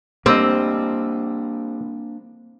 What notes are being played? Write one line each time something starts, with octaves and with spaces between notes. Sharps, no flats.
G3 A#3 C4 D4 C5 D#5